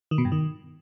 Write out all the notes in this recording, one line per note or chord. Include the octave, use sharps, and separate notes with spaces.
D#3
B2
G2
D#3